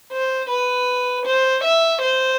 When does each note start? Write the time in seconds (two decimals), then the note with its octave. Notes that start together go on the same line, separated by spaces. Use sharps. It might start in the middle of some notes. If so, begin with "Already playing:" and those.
0.13 C5
0.50 B4
1.26 C5
1.64 E5
2.02 C5